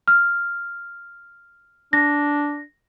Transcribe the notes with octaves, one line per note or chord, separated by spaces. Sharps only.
F6
D4 A#6